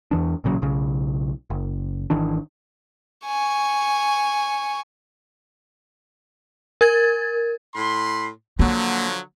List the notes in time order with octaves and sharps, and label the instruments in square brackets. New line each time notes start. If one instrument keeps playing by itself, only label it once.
[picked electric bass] E2 E3 D4
A1 A#2 C#3 F#3
B1 C#3
F#1
G#1 D#3 E3 D4
[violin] G#5 C#6
[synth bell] A#4 G#6 A6
[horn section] A2 B5 C6
[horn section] D3 F3 F#3 [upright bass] A#3